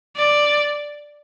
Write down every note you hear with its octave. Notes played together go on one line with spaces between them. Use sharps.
D5